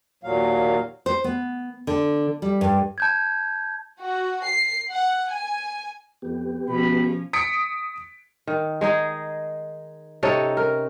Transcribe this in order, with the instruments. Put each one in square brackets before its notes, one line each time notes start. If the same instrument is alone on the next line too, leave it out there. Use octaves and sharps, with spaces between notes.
[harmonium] D#2 A#2 F#3 F5
[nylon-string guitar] C5
B3
D3
G3
G2
[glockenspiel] A5 G6 G#6
[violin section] F#4
C7
F#5
G#5
[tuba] F2 [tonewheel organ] B3 G4
[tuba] B2 [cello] F3 C#4 [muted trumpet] B5
[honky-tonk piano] D#6 B6 C#7 D7
[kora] D#3
G#3 D#4 G#4
C3 C#4 D#4 A4
A#4